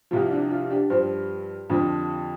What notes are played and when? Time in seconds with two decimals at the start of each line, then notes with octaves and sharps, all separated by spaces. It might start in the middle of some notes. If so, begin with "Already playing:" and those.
0.11 C2 C3 F3 F4
0.31 D4
0.51 F4
0.70 D4 G4
0.90 G2 F3 G4 C5
1.69 F2 D3 F3